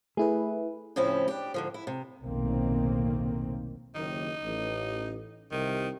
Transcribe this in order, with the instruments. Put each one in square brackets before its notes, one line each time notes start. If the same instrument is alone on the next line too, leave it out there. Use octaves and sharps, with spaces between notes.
[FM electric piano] A3 E4 B4 [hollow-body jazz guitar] G#4
[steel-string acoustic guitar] A2 C#3 F3 C4 C#4 E4
D4 G4
G#2 D3 F3
E4
C3
[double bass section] F1 B1 A2 D#3 A#3 C4
[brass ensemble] F#1 D#2 D#3 [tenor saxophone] D#4
[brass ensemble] A1
[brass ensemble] C2 C3 [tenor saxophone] D#3